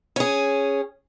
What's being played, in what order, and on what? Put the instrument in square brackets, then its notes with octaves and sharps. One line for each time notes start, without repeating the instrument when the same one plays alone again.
[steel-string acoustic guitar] C#4 G#4